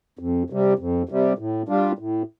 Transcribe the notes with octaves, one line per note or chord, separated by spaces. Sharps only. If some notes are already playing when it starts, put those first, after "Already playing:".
F2
C3 G3
F2
C3 G3
A2
G3 D4 F4
A2